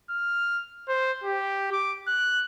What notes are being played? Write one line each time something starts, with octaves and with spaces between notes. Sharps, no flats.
F6
C5
G4
D6
F#6